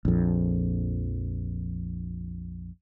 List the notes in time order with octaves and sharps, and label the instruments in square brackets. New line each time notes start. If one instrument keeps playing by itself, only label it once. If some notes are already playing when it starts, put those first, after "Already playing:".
[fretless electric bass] A#1 F2